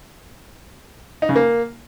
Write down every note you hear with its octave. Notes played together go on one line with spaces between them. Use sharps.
D#4
C#3
A#3